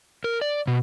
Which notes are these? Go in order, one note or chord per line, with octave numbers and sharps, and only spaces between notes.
A#4
D5
B2